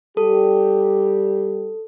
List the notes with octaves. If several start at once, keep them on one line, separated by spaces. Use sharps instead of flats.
G3 G4 A4